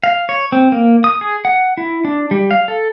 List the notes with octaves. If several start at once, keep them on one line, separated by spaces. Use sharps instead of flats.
F5
C#5
C4
A#3
D#6
G#4
F#5
E4
D4
G3
F5
A4